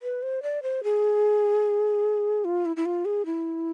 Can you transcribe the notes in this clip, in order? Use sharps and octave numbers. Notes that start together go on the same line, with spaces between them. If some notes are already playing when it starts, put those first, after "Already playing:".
B4
C5
D5
C5
G#4
F4
E4
E4
F4
G#4
E4